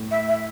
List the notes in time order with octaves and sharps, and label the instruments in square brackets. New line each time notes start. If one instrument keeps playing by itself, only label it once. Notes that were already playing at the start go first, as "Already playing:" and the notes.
Already playing: [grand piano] A2
[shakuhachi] E5
E5